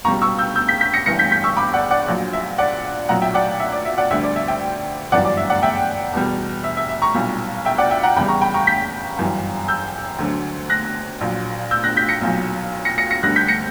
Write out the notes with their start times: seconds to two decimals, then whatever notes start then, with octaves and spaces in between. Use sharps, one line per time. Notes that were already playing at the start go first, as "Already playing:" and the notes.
0.05 C#2 B2 G3 A#5 C#6
0.22 C#6 E6
0.38 E6 G6
0.55 E6 G6
0.68 G6 B6
0.81 G6 B6
0.94 A#6 C#7
1.06 G1 G2 E3 A#6 C#7
1.19 G6 B6
1.32 G6 B6
1.44 C#6 E6
1.57 B5 D6
1.73 D5 F#5
1.91 D5 F#5
2.08 A#1 A#2 F#3
2.33 E5
2.58 D5 F#5
3.09 B1 A#2 F#3 F#5 A#5
3.22 E5 G5
3.34 D5 F#5
3.60 E5
3.72 D5
3.85 E5
3.98 D5 F#5
4.10 D2 D3 G3 E5
4.23 D5
4.36 E5
4.48 E5 G5
5.12 G1 F#2 E3 G3 D5 F#5
5.25 D5
5.37 E5
5.49 D5 F#5
5.62 E5 G5
6.13 E2 B2 G3
6.64 E5
6.77 E5
6.89 E5
7.02 A#5 C#6
7.15 B1 A#2 G3
7.65 E5 G5
7.78 D5 F#5
7.91 E5 G5
8.03 F#5 A#5
8.16 E2 C#3 G3 G5 B5
8.28 A#5 C#6
8.41 G5 B5
8.54 A#5 C#6
8.67 G6 B6
9.17 G1 F#2 E3 G3
9.68 E6 G6
10.19 D2 D3 F#3
10.70 F#6 A#6
11.21 A#1 A#2 F#3
11.71 E6 G6
11.84 F#6 A#6
11.96 G6 B6
12.09 A#6 C#7
12.21 B1 A#2 F#3
12.85 A#6 C#7
12.98 A#6 C#7
13.10 A#6 C#7
13.23 D2 D3 G3 F#6 A#6
13.36 G6 B6
13.48 A#6 C#7